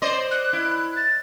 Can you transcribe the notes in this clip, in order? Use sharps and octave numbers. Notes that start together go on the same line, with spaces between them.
C5 D5 D#5 C6
F#6
E4
A6